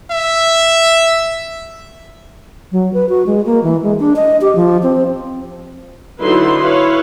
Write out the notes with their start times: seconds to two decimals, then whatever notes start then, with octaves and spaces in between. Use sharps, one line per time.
0.11 E5
2.72 F#3
2.93 B4
3.09 F#4
3.26 G#3
3.46 A#3
3.63 E3
3.83 G#3
3.99 D4
4.16 D#5
4.41 G4
4.55 F3
4.83 C4
6.21 D3 F#3 D#4 E4 B4 C6
6.58 E4 B4 C#5 F5